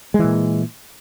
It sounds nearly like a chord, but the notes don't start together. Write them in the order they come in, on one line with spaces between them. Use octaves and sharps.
G#3 E3 A#2